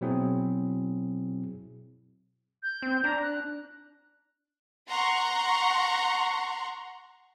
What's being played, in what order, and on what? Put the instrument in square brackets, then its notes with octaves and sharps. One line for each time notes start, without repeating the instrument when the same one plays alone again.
[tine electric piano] B2 F#3 C4 E4 G#4
[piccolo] G6
[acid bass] C4
[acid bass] D4 [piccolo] A#5
[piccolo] F#6
[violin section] F#5 A#5 C6 C#6